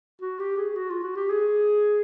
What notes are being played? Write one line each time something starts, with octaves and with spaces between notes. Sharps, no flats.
F#4
G4
G#4
F#4
F4
F#4
G4
G#4